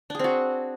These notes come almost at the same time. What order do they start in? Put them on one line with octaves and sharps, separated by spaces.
D4 G#4 C4 F#4